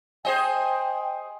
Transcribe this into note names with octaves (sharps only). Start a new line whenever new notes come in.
G#4 C5 D#5 G5 G#5